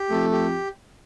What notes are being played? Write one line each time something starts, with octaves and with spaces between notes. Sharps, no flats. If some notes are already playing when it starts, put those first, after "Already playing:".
Already playing: G4
F2 A3
G4